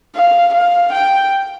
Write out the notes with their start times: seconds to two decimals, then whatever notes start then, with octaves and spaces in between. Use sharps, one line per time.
0.15 F5
0.53 F5
0.93 G5